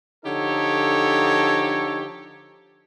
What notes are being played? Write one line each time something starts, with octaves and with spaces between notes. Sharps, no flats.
D3 F3 D#4 G4 A4 C#5